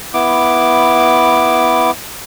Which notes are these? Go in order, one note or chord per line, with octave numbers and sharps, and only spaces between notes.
B3 E4 D6